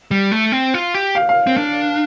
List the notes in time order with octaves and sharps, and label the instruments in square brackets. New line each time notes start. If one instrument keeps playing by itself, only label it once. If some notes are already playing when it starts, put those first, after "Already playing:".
[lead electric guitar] G3
A3
C4
F4
G4
[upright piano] F5
F5
[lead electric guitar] C4
D4